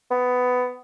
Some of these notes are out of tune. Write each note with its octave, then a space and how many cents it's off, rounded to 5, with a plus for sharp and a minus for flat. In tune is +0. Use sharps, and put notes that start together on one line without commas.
B3 +15